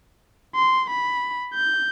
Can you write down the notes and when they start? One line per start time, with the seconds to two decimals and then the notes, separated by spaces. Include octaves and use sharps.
0.55 C6
0.90 B5
1.54 G6